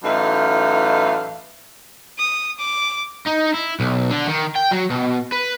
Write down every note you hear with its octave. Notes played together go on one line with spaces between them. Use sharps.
F#2 A2 E3 A3 D#4 F5
D#6
D6
D#4
E4
B1
D3
D#3
G5
F#3
B2
B4